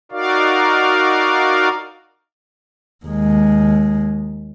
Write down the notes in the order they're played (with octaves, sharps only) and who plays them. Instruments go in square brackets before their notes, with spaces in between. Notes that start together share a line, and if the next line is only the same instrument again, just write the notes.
[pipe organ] D#4 F#4 A#4 D5 F5
[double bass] D#2 G#3